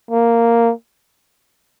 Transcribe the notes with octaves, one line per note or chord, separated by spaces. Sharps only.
A#3